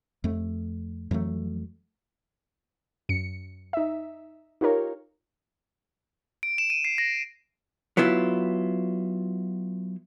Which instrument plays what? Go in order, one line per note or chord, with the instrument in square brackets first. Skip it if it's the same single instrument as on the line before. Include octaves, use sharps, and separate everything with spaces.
[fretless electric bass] F2 A3
F2 E3 F#3 A3
[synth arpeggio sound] F#2 C#7
D#4 E5
D#4 F4 G4 A#4 C#5
[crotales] D7
E7
D#7
C7
A#6
[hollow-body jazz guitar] F#3 B3 E4 F4